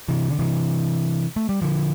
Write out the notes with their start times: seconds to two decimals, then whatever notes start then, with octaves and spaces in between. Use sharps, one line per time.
0.09 C3 E3
0.30 D3
0.39 C3 E3
1.36 A3
1.49 G3
1.62 D3 F3